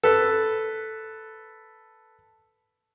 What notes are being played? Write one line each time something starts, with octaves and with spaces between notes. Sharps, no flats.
A4 B4